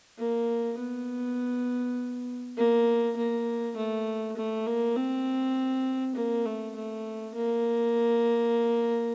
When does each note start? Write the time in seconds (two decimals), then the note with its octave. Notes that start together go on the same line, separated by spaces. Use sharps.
0.18 A#3
0.78 B3
2.57 A#3
3.17 A#3
3.77 A3
4.37 A3
4.67 A#3
4.96 C4
6.16 A#3
6.46 A3
6.76 A3
7.35 A#3